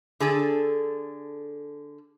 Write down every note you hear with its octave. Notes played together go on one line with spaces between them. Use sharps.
D3 G#4 A4